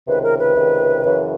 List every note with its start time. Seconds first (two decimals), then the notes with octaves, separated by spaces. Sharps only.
0.07 C#2 C3 D#3 B4
0.23 A#4
0.39 B4
0.55 C#2 C3 D#3
1.04 F#2 C#3 E3